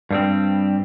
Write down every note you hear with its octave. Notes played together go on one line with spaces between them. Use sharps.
G2 G3 C4